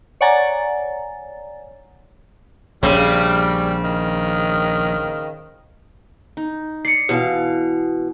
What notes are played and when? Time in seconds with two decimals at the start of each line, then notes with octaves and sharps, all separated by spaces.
0.21 C#5 D5 F#5 G#5 A#5 A6
2.83 A#1 C#3 G3 C4
3.84 D#3
6.37 D#4
6.85 D5 C7 C#7
7.09 B2 E3 E4 F5